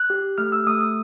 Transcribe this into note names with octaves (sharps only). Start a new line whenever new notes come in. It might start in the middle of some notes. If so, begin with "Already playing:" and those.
Already playing: F#6
G4
A3 F6
E6
A3 D#6
D#6